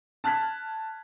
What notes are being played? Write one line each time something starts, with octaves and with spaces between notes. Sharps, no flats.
A5 F6 F#6 G#6 B6